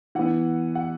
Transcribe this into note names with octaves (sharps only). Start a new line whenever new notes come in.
E3 B3 F#5
F#5